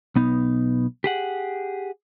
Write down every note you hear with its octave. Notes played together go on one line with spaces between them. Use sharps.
B1 B3 D#4
G4 G#4 F#5